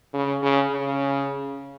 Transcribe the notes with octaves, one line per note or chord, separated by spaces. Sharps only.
C#3
C#3
C#3